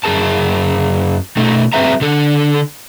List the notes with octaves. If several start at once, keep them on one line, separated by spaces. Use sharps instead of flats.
F#2 G#4 A#4 A5
B2 A3 D#4
F#3 C4 G#4 B4 E5 A#5
D3 A4